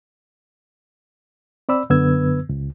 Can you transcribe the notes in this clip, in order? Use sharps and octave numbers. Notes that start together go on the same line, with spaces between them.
C4 D5 B5 E6
F#2 D3 B3 B4 E6 G#6
C#2